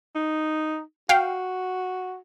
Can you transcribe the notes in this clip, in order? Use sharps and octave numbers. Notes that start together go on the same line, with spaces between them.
D#4
F#4 F5 G5